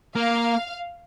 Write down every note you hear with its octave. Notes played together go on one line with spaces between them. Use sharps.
A#3 F5